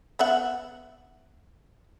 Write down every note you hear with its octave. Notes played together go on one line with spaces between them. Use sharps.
B3 E5 F#5